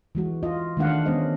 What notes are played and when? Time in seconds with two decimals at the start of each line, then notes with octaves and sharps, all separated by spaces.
0.15 E3 G#3 F#4
0.43 F4 D#5
0.77 D#3 G#3 A3 D4 F5 F#5
1.06 G#3 B3 C#4 C5 D#5